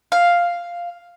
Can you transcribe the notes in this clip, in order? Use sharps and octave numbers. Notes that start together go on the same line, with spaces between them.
F5